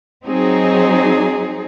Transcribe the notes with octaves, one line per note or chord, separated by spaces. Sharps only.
F#3 C4 D#4 G#4